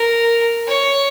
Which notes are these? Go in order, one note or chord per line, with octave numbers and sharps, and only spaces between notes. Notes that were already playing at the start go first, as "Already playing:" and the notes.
Already playing: A#4
C#5